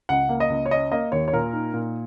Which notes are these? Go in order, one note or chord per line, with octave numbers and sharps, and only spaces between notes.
C#2 F#5
A#3
D#5
C#2
C#5
C#4 D#5
A#3 D#5
D#2 C#5
C#5
A#2 A#4
D#4
A#2